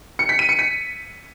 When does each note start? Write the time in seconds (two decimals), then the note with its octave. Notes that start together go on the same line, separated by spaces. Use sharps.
0.19 C#7
0.29 B6
0.39 D#7
0.49 C#7
0.59 B6